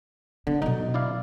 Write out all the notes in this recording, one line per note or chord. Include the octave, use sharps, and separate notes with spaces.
D3 B3
B2 F#3 D#4
E4 D5 F5